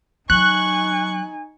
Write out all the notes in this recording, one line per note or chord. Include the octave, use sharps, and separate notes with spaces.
F#3 D#4 G#5 C#6 F#6